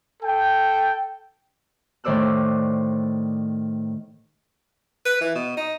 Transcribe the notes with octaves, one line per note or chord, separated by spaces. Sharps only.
A4 G5
A2 D#3 C5 D5 E6 F#6
B4
E3
B2
D#4